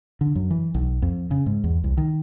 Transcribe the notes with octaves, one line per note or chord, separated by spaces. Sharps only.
D3
F#2
E3
B1
F2
C#3
G#2
E2
C2
D#3